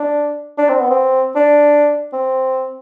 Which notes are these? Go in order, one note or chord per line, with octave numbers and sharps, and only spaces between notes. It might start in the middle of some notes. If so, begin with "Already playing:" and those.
Already playing: D4
D4
C4
B3
C4
D4
C4